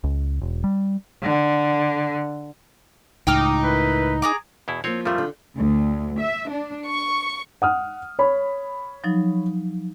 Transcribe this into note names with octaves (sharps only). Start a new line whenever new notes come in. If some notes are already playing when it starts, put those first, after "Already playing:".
C#2
E1
G3
D3
C#2 A2 D#4 G5 D6 F6
E4 A#4 B4
G#4 A#5 D6
E2 B2 E4
F3 G3 A#3 C4 C#5
F2 F3 G3 A3 F4 A#4 E5
D3
D2
E5
D4
C#6
F#5 D#6 F6
C#5 B5
F3 F#3 D#4